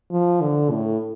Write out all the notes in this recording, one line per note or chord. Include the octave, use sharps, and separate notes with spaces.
F3
D3
A2